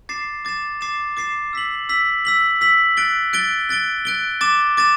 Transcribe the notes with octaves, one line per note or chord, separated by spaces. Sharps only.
D6 A6 C7 E7
D6 A6 C7 E7
D6 A6 C7 E7
D6 A6 C7 E7
E6 B6 F#7
E6 B6 F#7
E6 B6 F#7
E6 B6 F#7
F#6 A6 D7 G7
F#6 A6 D7 G7
F#6 A6 D7 G7
F#6 A6 D7 G7
D6 A6 E7
D6 A6 E7